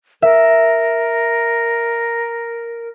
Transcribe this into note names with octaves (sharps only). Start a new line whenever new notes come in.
A#4 E5